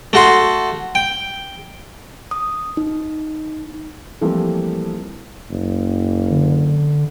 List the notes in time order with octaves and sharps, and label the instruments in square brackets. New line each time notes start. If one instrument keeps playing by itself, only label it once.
[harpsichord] A3 F#4 C6
G5
[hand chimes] D#6
D#4
[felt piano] E3 F3 G3 A3 A#3 C4
[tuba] F#1
[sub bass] D3